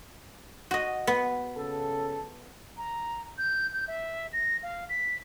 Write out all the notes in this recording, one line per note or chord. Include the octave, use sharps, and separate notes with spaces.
F#4 D#5
B3
C#3 A4
A#5
G6
G6
E5
A#6
F5
B6